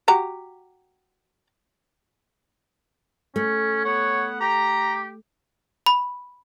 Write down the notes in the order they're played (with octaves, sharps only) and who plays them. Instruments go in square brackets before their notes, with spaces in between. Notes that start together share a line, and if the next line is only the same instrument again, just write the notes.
[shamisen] F#4 G4 A#5
[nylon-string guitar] A3 [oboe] C#4
[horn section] B3 F#5 [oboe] C#5
[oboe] G4 [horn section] A#5
[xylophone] B5